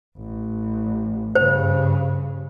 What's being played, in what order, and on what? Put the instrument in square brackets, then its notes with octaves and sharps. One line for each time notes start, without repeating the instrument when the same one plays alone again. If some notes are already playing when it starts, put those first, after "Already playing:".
[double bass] A1
[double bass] G2 C#3 [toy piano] C5